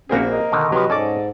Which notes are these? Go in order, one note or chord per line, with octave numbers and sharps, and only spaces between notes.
A#1 A#3 C4 C#4 F#4 G#4 B4
A#4 D#5
B2 D3 D#3
C3 F3 F#3 G4 B4
G#2 C#4 G#4 A4 D5 D6